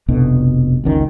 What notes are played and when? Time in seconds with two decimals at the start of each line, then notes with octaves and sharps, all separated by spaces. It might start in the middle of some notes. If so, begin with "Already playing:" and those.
0.08 F1 C2 B2 D3
0.84 F#1 C#2 D#3 C#4